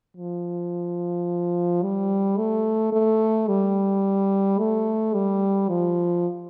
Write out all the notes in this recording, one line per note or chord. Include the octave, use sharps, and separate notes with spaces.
F3
G3
A3
A3
G3
A3
G3
F3